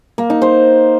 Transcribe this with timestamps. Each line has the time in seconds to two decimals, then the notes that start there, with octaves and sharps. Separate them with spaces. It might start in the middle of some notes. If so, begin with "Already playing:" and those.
0.18 A#3
0.30 D#4
0.42 C5